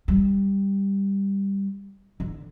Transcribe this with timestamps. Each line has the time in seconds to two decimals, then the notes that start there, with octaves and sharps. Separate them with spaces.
0.08 G3
2.20 D3